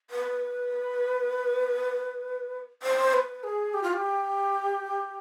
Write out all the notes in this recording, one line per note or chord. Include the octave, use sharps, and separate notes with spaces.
B4
C5
B4
G#4
G4
F4
G4